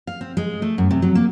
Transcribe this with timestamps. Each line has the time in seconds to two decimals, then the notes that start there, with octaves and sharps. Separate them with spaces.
0.07 F5
0.21 C4
0.37 G#3
0.62 A3
0.78 F#2
0.91 C3
1.02 F#3
1.15 A#3